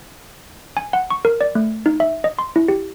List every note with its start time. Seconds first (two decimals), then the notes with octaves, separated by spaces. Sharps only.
0.77 G#5
0.93 F#5
1.10 C#6
1.25 A#4
1.41 D5
1.55 A3
1.86 D#4
2.00 E5
2.24 D#5
2.39 C6
2.56 E4
2.68 G4